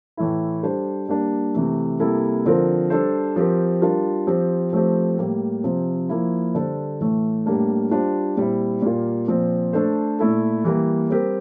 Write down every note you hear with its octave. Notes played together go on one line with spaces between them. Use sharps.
A2 E3 A3 E4
G3 D4 A4 C5
G3 A#3 D4
C3 E3 A3
C3 G3 A#3 E4 A4
D3 F3 C4 F4 A#4
G3 D4 A4 C5
F3 C4 G4 A#4
G3 D4 F4 A#4
F3 C4 G4
F3 A3 C4 G4
A2 G3 A#3
C3 F3 C4
F3 A#3 E4
D3 G3 D4 A4 C5
A2 E3 A3
A2 G3 A#3 D4
G3 D4 F4 C5
A#2 G3 C4 E4
A#2 G3 A#3 F4
A#2 F3 C4
A3 D4 A4 C5
A#2 A3 E4 A4
E3 G3 A#3
G3 C4 G4 A#4